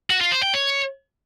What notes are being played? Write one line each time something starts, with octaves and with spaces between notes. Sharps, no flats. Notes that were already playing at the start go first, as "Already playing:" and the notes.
F#4
F4
C5
G5
C#5